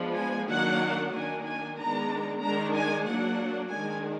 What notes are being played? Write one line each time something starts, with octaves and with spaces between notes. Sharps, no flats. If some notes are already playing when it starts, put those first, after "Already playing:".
Already playing: F3 G#3 B3 D4
G#5
D#3 F#3 A#3 D4 F#5
D#3 A#3 D4 G#5
G#5
D#3 G#3 B3 D4 A#5
D#3 G#3 D4 A#5
G#5
F#3 A#3 D4 F#5
D#3 G#3 D4 G#5